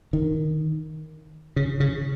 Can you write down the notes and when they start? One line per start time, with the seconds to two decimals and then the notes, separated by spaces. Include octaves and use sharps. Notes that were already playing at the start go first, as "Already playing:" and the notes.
0.13 D#3
1.56 C#3
1.80 C#3